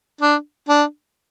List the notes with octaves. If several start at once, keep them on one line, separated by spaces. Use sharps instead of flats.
D4
D4